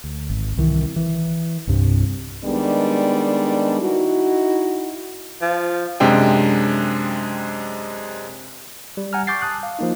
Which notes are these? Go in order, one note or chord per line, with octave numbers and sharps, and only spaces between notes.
D2
G#1
C2 D#3 E3
E3
C2 G2 C3
D#3 G3 G#3 B3 D4
D#4 E4 F#4
F3
F#2 C3 G#3 D4 G5
G3
F#5 G#5 A#5 F6
C#6 D6 G6 A6 C7
A5 D#6 F#6
F5
F3 A#3 D#4